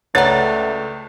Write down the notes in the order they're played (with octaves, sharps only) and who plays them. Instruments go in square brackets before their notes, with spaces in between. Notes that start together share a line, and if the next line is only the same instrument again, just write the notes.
[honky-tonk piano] C#2 A6 [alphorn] A3 [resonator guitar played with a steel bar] B4 D5 [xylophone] C#5 F#5 A#5